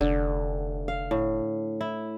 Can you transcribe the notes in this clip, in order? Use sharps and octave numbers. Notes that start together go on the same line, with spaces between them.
F1 D3
F5
A2
E4